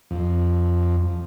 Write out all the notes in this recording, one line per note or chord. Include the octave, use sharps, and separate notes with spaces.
F2